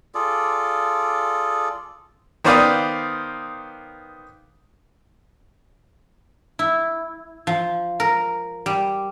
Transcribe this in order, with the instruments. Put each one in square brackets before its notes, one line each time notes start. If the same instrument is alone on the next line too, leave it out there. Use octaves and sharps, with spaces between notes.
[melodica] F4 G#4 A4 D5
[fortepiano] D#3 B3 C5 D5 F5 D#6
[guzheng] E4
F3
A#4
G3